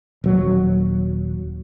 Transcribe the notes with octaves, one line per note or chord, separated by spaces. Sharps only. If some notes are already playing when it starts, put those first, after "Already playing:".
D#1 F#3